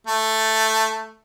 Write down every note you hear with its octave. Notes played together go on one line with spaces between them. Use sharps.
A3